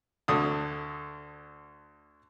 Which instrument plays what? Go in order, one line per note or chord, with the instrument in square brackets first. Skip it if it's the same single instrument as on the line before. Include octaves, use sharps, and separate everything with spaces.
[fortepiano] D2 D3 D#6